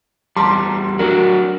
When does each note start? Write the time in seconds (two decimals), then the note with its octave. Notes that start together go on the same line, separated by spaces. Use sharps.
0.37 E2 G3 A5 A#5 C6
0.99 F#3 D4 F#4 A#4